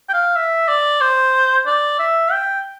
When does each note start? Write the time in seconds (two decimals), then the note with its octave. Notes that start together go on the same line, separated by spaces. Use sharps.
0.09 G5
0.14 F5
0.36 E5
0.68 D5
1.01 C5
1.66 D5
1.99 E5
2.32 G5